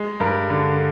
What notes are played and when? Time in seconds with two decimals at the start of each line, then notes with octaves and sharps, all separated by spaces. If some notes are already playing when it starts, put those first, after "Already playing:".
Already playing: G#3
0.20 G2 A#4
0.50 D3